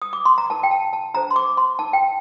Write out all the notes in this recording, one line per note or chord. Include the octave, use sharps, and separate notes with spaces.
D#6
D6
C6
A#5
D#4 A#4 A5
G5
A5
A5
D4 A4 C5 A#5
C6
D6
C6
D#4 A#4 A5
G5